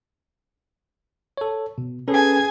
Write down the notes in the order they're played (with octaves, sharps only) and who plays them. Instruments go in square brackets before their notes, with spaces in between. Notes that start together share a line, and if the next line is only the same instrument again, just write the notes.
[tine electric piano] A4 C#5
B2
[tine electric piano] C#4 A4 B4 [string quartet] G#4 G#5